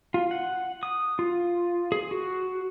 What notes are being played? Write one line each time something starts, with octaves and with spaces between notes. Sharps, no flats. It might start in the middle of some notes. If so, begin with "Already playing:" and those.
F4
F#5
D#6
F4
G#4
F#4